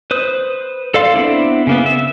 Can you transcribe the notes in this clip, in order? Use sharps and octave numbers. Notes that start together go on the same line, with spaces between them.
B4 C5 D#6
A4 D5 F5 C6
B3 C4 D4 E4
C#3 A#3 B3
E5